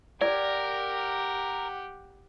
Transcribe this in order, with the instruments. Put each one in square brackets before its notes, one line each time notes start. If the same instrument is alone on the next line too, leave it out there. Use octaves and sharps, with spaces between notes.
[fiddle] G4 F#5 [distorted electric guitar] A#4 [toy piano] D5